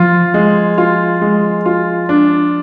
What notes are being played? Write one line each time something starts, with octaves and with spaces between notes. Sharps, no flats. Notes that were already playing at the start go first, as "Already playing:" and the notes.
Already playing: F3 F4
G#3
F4
G#3
F4
D4